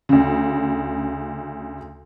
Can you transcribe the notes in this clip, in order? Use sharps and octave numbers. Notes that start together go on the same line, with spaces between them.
D2 C#3